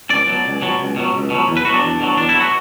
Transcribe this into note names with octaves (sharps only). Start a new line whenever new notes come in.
C#2 D5
B2 F#3
C#2
B2 F#3
C#2
B2 F#3
C#2
B2 F#3
E2
B4
B2 F#3 F#4
D4
E2
B2 F#3
E2 D4
E4
B2 F#3
F#4